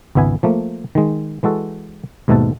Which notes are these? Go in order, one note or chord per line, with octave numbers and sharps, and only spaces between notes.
G#1 C#2 B3 E5 G#5
F3 A3 A#3
D#3 G#3
E3 G#3 F#4 A4
D#2 G#2 B2 A3 A4 A5